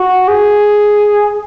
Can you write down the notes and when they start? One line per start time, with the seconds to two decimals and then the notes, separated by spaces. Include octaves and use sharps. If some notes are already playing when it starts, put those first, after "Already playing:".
Already playing: F#4
0.28 G#4